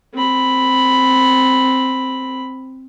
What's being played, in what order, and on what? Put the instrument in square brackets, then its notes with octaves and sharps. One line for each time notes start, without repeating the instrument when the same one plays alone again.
[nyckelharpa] C4 B5